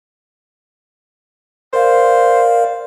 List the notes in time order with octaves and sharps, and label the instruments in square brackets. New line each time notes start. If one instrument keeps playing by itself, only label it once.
[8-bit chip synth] A#4 D5 F5 [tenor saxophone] C5